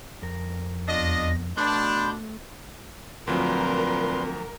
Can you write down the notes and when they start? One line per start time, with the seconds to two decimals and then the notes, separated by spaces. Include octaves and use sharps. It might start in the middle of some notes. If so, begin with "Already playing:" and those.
0.22 F2 A#4
0.88 E2 D4 F4 D#5 A#6
1.57 B2 A3 D4 B5 C6 G6
3.27 D2 A#2 F3 F#3 C4 A#4 B4 C6